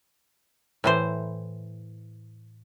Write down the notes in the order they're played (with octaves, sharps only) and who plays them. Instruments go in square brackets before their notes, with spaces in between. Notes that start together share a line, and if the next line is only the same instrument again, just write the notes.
[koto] A2 E3 C5